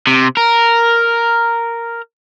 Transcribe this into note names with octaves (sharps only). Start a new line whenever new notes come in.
C3
A#4